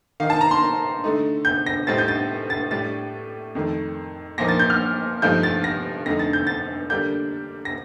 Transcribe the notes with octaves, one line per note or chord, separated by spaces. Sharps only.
D#3 A#3 D#4 F5
A5
A#5
C6
D3 A3 D#4
G6
A#6
A2 G3 C4 D#4 A6
G6
A6
A6
A2 G3 D4 A6
F2 D#3 A3
A#2 F3 A#3 D#4 A#6
A6
G6
F6
G2 F3 A3 D#4 G6
A6
A#6
F2 D3 A3 D#4 A#6
A6
G6
A6
D3 G3 A#3 D4 G6
A#6